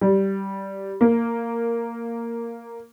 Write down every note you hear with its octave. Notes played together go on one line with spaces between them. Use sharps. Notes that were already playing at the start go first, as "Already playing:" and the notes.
G3
A#3